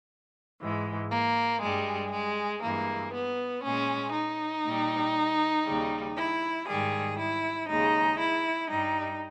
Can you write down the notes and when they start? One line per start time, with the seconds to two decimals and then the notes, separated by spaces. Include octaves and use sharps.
0.61 G#2 E3 G#3
1.11 A#3
1.61 G2 G3 G#3
2.12 G#3
2.62 G2 E3 G#3 A#3
3.13 B3
3.63 A#2 G#3 C#4
4.13 D#4
4.64 A#2 G3
5.65 D#2 C#3 G3
6.17 E4
6.66 G#2 D#3 G3 G#4
7.17 E4
7.68 D#2 C#3 G#3 D#4
8.19 E4
8.69 G2 G3 D#4